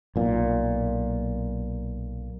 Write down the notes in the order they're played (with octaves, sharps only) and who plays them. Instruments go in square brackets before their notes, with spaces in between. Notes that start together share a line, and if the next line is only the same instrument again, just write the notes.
[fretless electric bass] B1 A#2